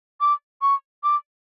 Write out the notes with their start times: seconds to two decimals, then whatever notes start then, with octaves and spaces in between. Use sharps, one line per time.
0.21 D6
0.62 C#6
1.04 D6